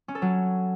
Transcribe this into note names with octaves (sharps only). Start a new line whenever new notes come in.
C#4
A4
F#3